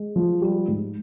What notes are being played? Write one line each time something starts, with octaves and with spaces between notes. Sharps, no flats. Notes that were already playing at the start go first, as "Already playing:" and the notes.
Already playing: G#3
F3
G3
G#2